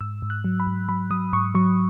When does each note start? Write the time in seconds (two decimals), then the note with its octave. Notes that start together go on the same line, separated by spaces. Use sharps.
0.01 G#2 E6
0.22 G#2
0.30 F#6
0.44 F#3
0.60 B5
0.67 G#2
0.89 F#3 B5
1.11 F#3 D#6
1.33 G#2 C#6
1.55 F#3 C#6